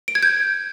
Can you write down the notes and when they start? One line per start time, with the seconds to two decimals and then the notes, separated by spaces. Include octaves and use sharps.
0.08 D7
0.15 G#6
0.23 G6